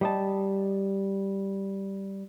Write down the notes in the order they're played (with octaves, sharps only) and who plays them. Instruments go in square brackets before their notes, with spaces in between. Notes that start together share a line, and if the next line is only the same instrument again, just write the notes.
[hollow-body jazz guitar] G3 D#5 A5